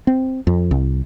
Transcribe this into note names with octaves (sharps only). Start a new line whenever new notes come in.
C4
F2
C2